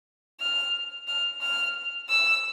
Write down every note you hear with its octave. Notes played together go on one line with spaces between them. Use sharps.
F6
F6
F6
E6